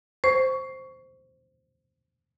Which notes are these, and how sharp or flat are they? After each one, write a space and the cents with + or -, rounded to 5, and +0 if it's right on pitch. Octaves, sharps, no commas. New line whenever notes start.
C5 +0 C#6 +15